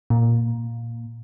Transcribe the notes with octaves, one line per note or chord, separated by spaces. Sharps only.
A#2